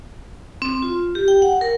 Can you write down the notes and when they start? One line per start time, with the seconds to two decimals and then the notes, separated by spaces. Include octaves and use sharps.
0.62 C4
0.82 F4
1.15 G4
1.28 G5
1.42 F#5
1.61 A#4